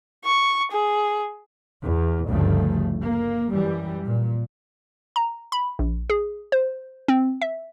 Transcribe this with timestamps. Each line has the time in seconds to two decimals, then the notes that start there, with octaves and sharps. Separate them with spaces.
0.25 C#6
0.72 G#4
1.84 E2
2.28 G1 D2 G2 C#3 F3 A3
3.01 A#3
3.51 F#2 E3 G3
4.07 A#2
5.16 A#5
5.52 B5
5.79 A#1
6.10 G#4
6.52 C5
7.08 C4
7.42 E5